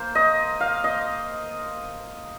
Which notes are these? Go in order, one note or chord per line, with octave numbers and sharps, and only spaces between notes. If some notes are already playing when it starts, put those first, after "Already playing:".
Already playing: A#3 C5
D#5
F5
D#5